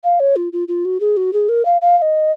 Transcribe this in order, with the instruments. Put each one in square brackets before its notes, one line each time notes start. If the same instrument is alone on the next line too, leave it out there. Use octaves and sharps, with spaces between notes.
[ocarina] F5
C#5
F4
F4
F4
F#4
G#4
F#4
G#4
A#4
F5
F5
F5
D#5